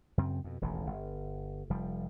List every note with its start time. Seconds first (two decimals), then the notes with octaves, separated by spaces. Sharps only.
0.18 F#2 C#3 C4
0.44 F2 B2
0.61 E1 A1 D#2 A2
0.86 G1
1.70 F1 F3 G3